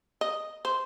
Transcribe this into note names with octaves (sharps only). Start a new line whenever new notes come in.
D#5
C5